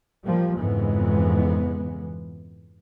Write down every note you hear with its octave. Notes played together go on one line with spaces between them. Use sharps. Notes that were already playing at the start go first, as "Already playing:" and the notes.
F3 G3 A#3
F2 G#2 C#3 E3 G#3 B3